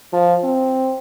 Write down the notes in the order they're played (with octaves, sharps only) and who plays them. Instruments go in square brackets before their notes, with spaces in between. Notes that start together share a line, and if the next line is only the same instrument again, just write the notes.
[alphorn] F3
C4